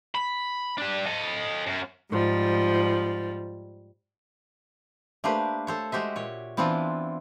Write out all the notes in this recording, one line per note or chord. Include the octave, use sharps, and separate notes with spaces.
B5
D4 G4
A4 D#5
F#2
G#2 F3 G3
A3 A#3 D4 G4 B4 C5
A4 C5 C#5
G#3 F#4 G4 C5 E5
A#2 C#5
E3 B3 C4 D4 E4 F4